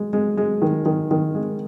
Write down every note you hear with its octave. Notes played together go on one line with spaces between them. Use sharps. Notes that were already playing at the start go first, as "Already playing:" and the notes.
Already playing: G#3
G#3
G#3
D#3
D#3
D#3
G#3